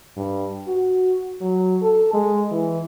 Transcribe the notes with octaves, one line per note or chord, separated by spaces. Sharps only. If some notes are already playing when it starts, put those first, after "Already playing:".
G2
F#4
F#3
A4
G#3
E3